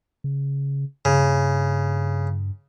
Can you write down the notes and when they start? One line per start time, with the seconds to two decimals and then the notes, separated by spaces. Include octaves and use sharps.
0.24 C#3
1.05 G2 C#3